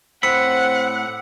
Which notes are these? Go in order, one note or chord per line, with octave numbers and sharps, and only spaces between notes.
A2 C4 F#5 B5 E6 C#7